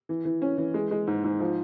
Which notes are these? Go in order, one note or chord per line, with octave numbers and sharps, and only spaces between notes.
E3
E3
C#4
E3
G#3
G#3
G#2
G#2
F3